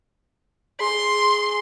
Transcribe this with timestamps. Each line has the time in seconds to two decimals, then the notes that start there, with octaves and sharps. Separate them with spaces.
0.80 G#4 C6